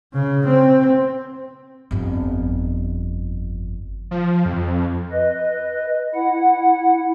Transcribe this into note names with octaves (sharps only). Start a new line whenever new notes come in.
C#3
C4
G1 F2
F3
F2
B4 D#5
E4 F#5